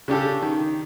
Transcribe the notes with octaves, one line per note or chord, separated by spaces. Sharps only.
C#3 D4 G4 A4
D#3